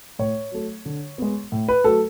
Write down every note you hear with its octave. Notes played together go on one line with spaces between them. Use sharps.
A2 C#5
F#3 A3
D3
G#3 B3
A2
B4
F#3 A3 A4